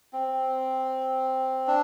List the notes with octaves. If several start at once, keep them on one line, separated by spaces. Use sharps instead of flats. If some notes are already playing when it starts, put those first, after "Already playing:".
C4
D4